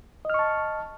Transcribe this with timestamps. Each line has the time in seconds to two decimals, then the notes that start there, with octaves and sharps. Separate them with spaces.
0.25 D#5
0.30 F6
0.34 C#6
0.39 A5